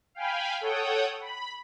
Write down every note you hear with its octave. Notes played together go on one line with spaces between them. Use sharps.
F5 G5 G#5 B5
A4 C#5 F#5 G5 D#6
B5